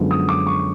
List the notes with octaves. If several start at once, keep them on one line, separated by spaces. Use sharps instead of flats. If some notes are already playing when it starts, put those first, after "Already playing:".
Already playing: F#2 D3 F3 G#3 B3
D#6
D6
C#6